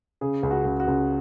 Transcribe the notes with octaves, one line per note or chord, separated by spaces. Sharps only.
C#3 G#4
C#2
F#4
C#2
F#4
C#2